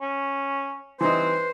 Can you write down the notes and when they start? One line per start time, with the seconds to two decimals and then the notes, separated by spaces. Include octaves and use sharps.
0.02 C#4
1.01 E3 G3 C4 D#4 B4 C5